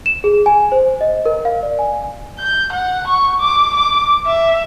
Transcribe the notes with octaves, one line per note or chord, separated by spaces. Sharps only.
E7
G#4
G#5
C5
D#5
A#4
F5
D5
G#5
G6
F#5
C#6
D6
D6
E5